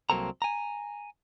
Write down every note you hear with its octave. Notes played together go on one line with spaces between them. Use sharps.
C2 F#3 A#3 C4 A4 A#5
G#5 A#5